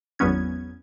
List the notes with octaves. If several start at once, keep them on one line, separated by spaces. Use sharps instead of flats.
G#1 E2 F#3 B3 C#4 G#6